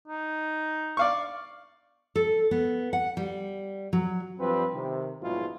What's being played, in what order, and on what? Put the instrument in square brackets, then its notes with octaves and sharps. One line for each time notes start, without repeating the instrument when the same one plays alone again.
[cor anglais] D#4
[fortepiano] D5 F5 C#6
[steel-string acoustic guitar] A4
B3
F#5
G3
F#3
[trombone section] G2 F3 G3 C4 B4
C3 D#3
A#1 G#2 B2 F#3 E4 F4